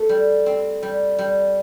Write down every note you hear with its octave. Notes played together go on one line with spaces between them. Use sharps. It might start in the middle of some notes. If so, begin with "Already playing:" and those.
Already playing: A3
G3
C4
G3
G3